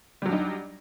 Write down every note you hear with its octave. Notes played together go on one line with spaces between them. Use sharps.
F#3 G3 D4 D#4